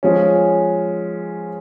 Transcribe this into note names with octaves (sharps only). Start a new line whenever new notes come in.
F3 G#3 C#4